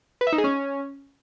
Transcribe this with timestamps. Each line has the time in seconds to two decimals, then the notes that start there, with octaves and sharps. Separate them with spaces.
0.21 B4
0.27 E5
0.32 D#4
0.38 G#4
0.44 C#4